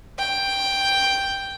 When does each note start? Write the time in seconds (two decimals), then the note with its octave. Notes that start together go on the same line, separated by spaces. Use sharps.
0.19 G5